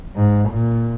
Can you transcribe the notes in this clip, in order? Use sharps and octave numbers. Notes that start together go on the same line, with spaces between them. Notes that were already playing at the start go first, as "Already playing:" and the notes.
G#2
A#2